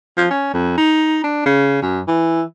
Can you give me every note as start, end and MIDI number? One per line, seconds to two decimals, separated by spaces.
0.17 0.30 53
0.30 0.51 61
0.53 0.74 41
0.77 1.23 63
1.23 1.44 62
1.45 1.79 49
1.82 2.00 42
2.08 2.42 52